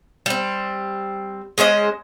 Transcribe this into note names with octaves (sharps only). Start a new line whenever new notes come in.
G3 C4
G#3 C#4 C5 D#5